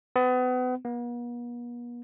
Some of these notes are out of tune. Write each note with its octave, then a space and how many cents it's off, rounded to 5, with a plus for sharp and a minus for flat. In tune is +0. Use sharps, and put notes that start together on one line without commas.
B3 +35
B3 -45